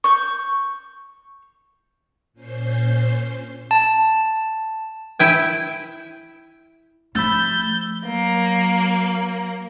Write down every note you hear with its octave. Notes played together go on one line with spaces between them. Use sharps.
C#6 G6
A#2 C#4 C5 C6
A5
E4 G5 G#5
F3 A3 B5 E6 G6 A6
F#3 A#3